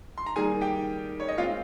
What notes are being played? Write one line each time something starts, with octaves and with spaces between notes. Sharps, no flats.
C6
A#5
D#3 G3 A#3 G#4 G#5
G4 G5
C#5
D#5
A#2 G#3 C4 F4 F5